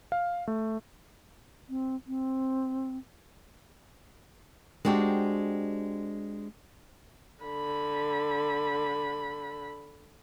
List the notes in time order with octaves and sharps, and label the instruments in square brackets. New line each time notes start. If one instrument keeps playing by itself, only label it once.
[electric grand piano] F5
A3
[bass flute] C4
C4
[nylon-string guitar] G#3 C4 D4 F#4 G4
[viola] D3 B5